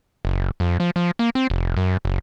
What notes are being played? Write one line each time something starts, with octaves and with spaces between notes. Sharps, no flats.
F#1
F2
F3
F3
A#3
C4
F1
F#2
F#1